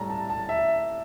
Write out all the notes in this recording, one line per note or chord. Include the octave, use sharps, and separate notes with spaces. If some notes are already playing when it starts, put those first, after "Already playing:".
Already playing: A2 G3 A5 A#5
A5
A5
E5